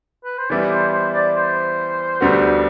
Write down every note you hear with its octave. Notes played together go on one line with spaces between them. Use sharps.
B4
C5
E3 G3 B3 E4 D5
C5
C5
D5
C5
D2 D3 G3 B3 F#4